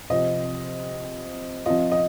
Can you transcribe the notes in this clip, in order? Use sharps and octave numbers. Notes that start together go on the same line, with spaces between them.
C3 F3 C4 D#5
F3 C4 F4 D#5
D#5